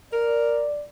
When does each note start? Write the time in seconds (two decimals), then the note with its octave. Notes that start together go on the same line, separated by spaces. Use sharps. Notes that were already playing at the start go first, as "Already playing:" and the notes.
0.13 A#4 D5